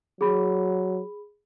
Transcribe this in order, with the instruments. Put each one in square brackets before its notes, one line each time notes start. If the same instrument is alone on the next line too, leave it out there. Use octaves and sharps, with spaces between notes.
[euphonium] F#3 [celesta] G#4 B5